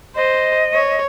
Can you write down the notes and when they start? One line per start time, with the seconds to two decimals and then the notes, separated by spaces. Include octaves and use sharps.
0.16 C5 D#5
0.73 C#5